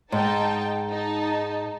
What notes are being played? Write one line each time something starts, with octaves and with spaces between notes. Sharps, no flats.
G#2 D#4 G5 A5
D#4 A5